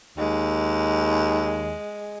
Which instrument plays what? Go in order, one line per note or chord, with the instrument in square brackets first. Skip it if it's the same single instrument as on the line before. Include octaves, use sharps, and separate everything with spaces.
[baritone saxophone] D#2 [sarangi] G#3